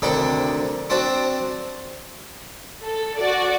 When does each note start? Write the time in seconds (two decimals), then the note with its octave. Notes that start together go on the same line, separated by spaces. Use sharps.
0.02 D2 C3 D#3 D4 A4 G5
0.90 C4 D4 F#4 A5
2.83 A4
3.18 F#4 D5